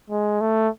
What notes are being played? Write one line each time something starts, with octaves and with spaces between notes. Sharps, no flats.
G#3
A3